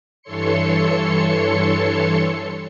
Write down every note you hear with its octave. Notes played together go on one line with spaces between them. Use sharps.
G2 E3 A4 C#5 C6 C#7